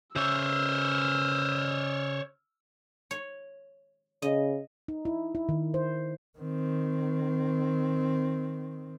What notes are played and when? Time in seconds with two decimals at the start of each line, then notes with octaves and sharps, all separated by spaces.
0.16 C#3 C5 C#5 E5 E6 F6
3.11 C#5
4.22 C#3 D#5
4.88 D#4
5.05 E4
5.35 E4
5.49 D#3
5.74 C5
6.38 D#3 C4